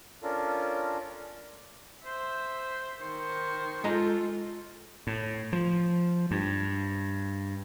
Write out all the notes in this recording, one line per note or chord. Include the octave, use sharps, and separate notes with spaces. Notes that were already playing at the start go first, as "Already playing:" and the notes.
C#4 D4 F4 A4 A#4
C5 E5
D#3 C5 C#6
G#3 F4 A4 D#5 A#5
A2
F3
G2